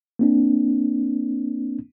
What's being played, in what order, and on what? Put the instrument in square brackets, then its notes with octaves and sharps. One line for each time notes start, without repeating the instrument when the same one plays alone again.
[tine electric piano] A#3 C4 D4